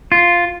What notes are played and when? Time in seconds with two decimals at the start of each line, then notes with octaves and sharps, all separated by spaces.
0.12 F4